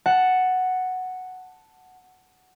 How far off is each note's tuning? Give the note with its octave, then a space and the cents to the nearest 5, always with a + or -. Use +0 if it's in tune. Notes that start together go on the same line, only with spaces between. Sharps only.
F#5 +0 A5 +0